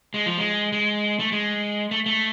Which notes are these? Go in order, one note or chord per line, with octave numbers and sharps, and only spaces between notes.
G#3
F3
G#3
G#3
A3
G#3
A3
A3